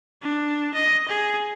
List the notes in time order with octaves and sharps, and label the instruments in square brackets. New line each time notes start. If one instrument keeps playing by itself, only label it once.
[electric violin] D4
D#5
G#4